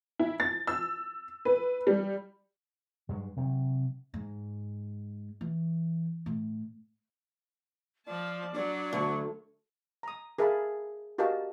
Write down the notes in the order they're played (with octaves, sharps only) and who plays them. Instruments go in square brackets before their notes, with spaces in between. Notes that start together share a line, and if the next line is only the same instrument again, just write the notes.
[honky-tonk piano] E4
A6
E6
B4
G3
[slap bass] G2 F#3 G#3
C3 F#3
[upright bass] G#2
E3
A2
[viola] F3 A5 [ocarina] D5
[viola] F#3 [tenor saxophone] D4
[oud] D2 [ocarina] C#6
[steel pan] A#5 D#6
G#4 A#4 E5 F5 A5 B5
F#4 G4 A#4 D#5 F5 A5